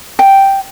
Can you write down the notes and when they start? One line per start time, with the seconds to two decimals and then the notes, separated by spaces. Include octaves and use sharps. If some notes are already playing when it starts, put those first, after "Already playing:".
0.19 G5